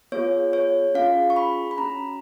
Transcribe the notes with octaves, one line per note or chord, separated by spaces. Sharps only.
B3 F4 G#4 C#5
C#5
C#4 F4 G#4 F5
C#6
B5
B5
C#4 F#4 A#5